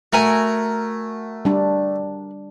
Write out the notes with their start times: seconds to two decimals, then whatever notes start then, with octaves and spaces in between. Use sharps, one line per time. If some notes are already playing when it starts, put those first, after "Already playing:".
0.13 A3 F#4 A#4 G#5
1.45 G3 D4